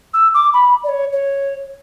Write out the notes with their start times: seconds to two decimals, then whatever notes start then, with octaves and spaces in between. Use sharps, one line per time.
0.13 E6
0.34 D6
0.53 B5
0.84 D5
0.88 C#5
1.12 C#5